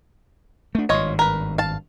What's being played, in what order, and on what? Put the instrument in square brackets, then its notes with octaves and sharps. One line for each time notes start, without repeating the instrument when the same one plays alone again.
[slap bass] A3 D4
[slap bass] G#1 G2 [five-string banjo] F4 C#5 D#5
[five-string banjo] A#4 B4
F5 A5